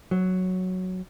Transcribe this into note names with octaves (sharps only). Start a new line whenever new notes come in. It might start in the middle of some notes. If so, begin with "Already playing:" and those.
F#3